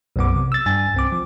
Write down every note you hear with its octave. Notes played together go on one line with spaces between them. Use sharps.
B1 F#2 B3 D6
C3
E6 A6
G2 G#5 A6
C2 C4 D6
F3